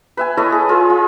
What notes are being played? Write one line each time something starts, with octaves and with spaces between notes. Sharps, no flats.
B4 E5 G#5
E4 A4 C#5 D#5
G#4
F4 G#4
F4